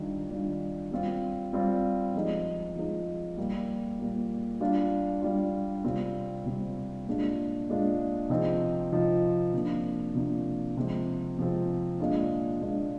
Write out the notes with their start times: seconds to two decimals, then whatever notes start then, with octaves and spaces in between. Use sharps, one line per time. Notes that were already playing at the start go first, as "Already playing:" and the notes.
Already playing: D#3 G3 D4 F4
0.29 D#3 G3 D4 F4
0.91 G3 C4 F4
1.53 G3 C4 F4
2.14 F3 G#3 D#4
2.76 F3 G#3 D#4
3.37 A#2 G3 A#3
3.99 A#2 G3 A#3
4.60 G3 D4 F4
5.22 G3 D4 F4
5.84 C3 G3 C4 F4
6.45 C3 G3 C4 F4
7.07 A#2 G#3 D4 F4
7.69 A#2 G#3 D4 F4
8.30 C3 F3 C4 D#4
8.92 C3 F3 C4 D#4
9.53 C3 F3 A#3 D4
10.15 C3 F3 A#3 D4
10.77 C3 F3 G#3 C4
11.37 C3 F3 G#3 C4
12.00 A#2 G#3 D4 F4
12.61 A#2 G#3 D4 F4